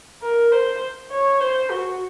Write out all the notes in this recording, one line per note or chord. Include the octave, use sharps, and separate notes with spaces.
A#4
C5
C#5
C5
F#4